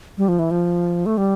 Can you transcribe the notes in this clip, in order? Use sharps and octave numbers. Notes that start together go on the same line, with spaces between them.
G3
F3
E3
F3
A3
G3